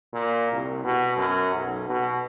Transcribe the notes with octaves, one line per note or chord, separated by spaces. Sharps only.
A#2
C2
B2
F#2
B1
B2